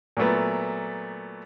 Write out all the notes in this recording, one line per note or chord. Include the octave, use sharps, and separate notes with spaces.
A#2 F#3 A3 B3